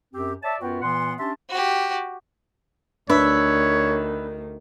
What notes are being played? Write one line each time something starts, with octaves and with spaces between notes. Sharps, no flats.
F#2 C4 G4
C#5 D5 E5 A5
F#2 B3 F4 F#4 B4 G5
A#2 E3 B3 F#5 C6
C#4 D4 G4 E5 A5 C6
F#4 G4
D2 D#3 D4 B4 C#5 E5